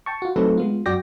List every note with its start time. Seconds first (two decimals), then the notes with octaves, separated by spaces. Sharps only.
0.06 G5 A5 C#6
0.22 F4 F#4
0.36 F#3 A3 C4 D#4 A4 B4
0.58 G#3 B3 F4
0.86 F#2 F#4 D5 G5 A#6